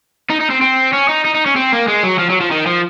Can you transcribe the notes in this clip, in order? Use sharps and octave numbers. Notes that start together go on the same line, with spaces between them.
D#4
D#4
C4
C4
C#4
D#4
D#4
D#4
C#4
C4
A#3
G#3
F#3
F3
F#3
F3
D#3
F3